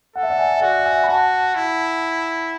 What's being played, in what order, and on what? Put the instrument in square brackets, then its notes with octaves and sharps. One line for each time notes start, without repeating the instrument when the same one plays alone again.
[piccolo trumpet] A4 [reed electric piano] F#5
[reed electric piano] E5
D5 F#5
E5 G#5
E5
[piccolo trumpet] F#4 [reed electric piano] D5 F#5
[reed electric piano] E5 G#5
B5
[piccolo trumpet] F#4 [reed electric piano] F#5 A5
[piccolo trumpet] E4